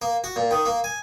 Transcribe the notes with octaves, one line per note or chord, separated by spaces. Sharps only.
A#3
F#4
A#2
D#3
A#3
G#5